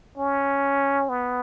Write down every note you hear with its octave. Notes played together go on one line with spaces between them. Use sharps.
C#4
B3